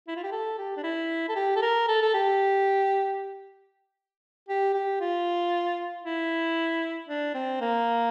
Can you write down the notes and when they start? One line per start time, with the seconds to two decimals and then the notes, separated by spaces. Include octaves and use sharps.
0.08 E4
0.16 F4
0.24 G4
0.32 A4
0.58 G4
0.77 D4
0.84 E4
1.29 A4
1.36 G4
1.56 A4
1.62 A#4
1.88 A4
2.02 A4
2.14 G4
4.49 G4
4.74 G4
5.01 F4
6.04 E4
7.09 D4
7.35 C4
7.61 A#3